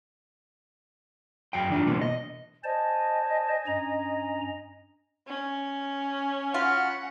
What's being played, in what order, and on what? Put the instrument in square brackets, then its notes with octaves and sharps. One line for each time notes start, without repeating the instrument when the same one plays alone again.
[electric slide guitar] F#2 F#3 F5 G5
E3 D4 F4
B2 E3 G3 A#3 B3
D#5
[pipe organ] C5 D5 A5 [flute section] D#5 G#5
[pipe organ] G2 C#4 A#5
[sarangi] C#4
[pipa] F4 [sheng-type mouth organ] F#4 B5 F6 [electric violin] F#5